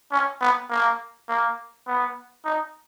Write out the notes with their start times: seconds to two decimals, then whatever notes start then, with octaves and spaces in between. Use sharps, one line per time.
0.12 C#4
0.41 B3
0.70 A#3
1.29 A#3
1.87 B3
2.45 D#4